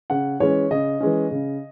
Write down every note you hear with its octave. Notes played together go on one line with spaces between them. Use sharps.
C#3 F#5
E3 G#3 C#4 C#5
C#3 D#5
E3 G#3 C#4
C#3